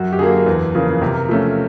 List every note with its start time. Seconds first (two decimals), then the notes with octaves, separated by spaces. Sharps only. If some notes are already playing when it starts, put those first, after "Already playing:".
Already playing: F#2 F#4
0.13 G4
0.19 D3 F#3 A#3 G#4
0.46 E2
0.75 C#3 F3 A#3
1.01 C3 A#4
1.29 F3 A3 C#4